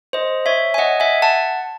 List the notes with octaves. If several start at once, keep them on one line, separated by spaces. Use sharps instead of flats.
C5 D#5
C#5 E5
G#5
D#5 F#5
E5 G#5
F#5 A5